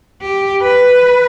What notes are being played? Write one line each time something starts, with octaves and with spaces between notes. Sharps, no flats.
G4
B4